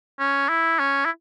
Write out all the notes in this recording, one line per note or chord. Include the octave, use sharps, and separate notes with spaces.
C#4
E4
C#4
E4